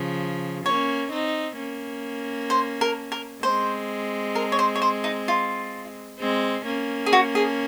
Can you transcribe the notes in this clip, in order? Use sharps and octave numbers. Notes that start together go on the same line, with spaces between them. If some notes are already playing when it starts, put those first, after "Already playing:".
Already playing: C#3 F3
A#3 C#4 C#5
C4 D#4
A#3 C#4
C5
A#4
A#4
G#3 C4 C5
A#4
C#5
C5
C#5
C5
D#4
F4
G#3 C4
A#3 C#4
G#4
F#4
G#4